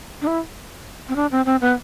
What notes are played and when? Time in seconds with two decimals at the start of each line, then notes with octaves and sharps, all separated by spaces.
0.22 D4
0.27 E4
1.09 C4
1.16 D4
1.32 C4
1.46 C4
1.61 B3